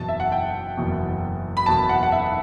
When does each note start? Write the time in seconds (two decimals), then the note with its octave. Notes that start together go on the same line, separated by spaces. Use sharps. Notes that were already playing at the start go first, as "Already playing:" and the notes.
Already playing: F#1 E2 B2 A5
0.09 E5
0.20 F#5
0.32 G5
0.77 F#1 E2 B2
1.57 B5
1.66 F#1 E2 B2 A5
1.89 F#5
2.03 F#5
2.12 E5